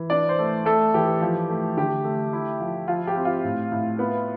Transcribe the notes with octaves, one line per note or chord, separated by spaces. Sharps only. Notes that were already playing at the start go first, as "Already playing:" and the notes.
Already playing: E3
D4 D5
C5
A3
A3 A4
E3 G4
F3
A3
D3 G4
A3
E4
F3
F3 F4
G4
C4
F4
A2
A2
B3